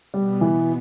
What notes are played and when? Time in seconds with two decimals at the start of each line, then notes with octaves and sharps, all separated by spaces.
0.14 B2 G3 B3
0.41 E3